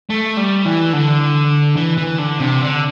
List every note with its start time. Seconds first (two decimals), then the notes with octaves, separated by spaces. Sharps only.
0.10 A3
0.37 G3
0.65 E3
0.93 D3
1.77 E3
1.98 E3
2.19 D3
2.40 C3
2.61 D3